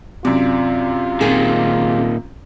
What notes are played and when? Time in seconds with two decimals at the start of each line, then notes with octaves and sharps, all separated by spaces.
0.25 F#2 C3 F4 D5
1.21 A#2 D#3 C4 G#4